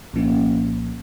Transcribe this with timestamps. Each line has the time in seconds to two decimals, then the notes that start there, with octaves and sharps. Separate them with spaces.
0.13 C2 A#2 F3 A#3 C#4